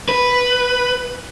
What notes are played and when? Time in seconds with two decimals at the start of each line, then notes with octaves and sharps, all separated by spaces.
0.09 B4